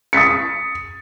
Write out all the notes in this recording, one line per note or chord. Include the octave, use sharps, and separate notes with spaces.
D#6 A6 B6 C#7